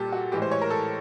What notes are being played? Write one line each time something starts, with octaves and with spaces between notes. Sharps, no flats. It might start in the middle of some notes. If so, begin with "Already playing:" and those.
Already playing: A#2 G3 A#3 G4 A4
F#4
A2 E3 G#3 G4
C5
C#5
A#4
A4